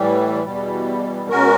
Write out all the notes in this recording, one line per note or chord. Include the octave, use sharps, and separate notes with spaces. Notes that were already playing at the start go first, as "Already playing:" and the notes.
Already playing: A2 E3 G3
E2 B2 G3
B2 G#3 C#4 F#4 A#4